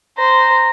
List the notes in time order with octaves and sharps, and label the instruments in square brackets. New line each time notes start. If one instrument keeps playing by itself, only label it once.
[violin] C5 [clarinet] A#5